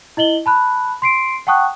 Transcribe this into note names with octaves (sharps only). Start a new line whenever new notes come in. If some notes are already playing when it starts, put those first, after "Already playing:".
E4 D#5 F#7 G7
A5 B5 F#6
C6 C7 D7
F#5 G5 A5 C#6 D#6 F#6